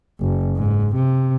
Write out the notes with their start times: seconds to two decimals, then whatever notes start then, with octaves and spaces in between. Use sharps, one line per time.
0.20 F#1
0.56 G#2
0.95 C3